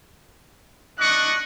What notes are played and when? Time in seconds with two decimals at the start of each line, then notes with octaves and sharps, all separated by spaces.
1.00 D4 D#5 C#6 F#6